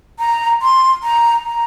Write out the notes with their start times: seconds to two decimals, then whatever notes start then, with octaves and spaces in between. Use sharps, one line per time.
0.19 A#5
0.62 C6
1.03 A#5
1.45 A#5